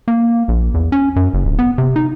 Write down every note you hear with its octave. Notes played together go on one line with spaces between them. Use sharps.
A#3
A#1
E2
C#4
F#2
F#1
D1
B3
C3
D#4